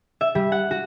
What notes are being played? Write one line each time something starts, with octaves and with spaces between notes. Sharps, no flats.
E5
G3
F#5
F#4